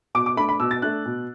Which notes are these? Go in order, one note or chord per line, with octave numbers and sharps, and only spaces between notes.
B2 D6
D6
A3 D4 B5
B5
B2 E6
A6
A3 D4 F#6
B2